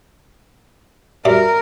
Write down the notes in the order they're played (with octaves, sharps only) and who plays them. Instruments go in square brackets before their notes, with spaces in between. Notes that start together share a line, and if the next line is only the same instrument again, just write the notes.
[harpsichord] F#2 G3 E5 [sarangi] A#4